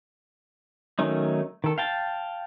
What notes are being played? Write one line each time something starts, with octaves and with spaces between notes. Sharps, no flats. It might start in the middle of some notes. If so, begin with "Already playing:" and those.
D#3 F#3 A3 C#4 D#4
D#3 A4
F5 G5 A5